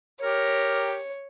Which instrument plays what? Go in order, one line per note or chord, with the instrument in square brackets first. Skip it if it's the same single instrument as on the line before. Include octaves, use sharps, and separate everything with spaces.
[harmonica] G4 A#4 [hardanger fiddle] C#5